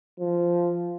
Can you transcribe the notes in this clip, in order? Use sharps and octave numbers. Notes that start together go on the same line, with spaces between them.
F3